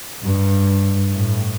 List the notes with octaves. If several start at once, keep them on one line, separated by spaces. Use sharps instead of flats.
G2
A2